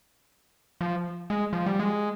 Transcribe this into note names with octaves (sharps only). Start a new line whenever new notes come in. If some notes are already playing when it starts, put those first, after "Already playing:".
F3
G#3
F3
G3
G#3